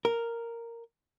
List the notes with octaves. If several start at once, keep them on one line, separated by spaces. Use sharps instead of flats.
A#4